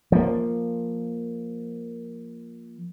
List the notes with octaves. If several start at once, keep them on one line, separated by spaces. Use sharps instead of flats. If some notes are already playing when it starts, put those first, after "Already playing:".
F3 A#3